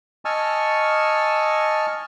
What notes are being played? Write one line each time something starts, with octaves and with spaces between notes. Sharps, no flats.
D#5 G#5 A5 C#6 E6 F6